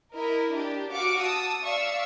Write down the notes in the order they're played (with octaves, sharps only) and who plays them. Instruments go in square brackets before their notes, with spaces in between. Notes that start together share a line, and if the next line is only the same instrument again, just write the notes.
[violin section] E4 A#4 D#5
D4 G4
F#4 F5 D6 C#7
A5 D#6 E6
D5 E5 F5 C#6 E6